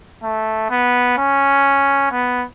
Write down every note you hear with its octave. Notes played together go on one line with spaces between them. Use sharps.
A3
B3
C#4
B3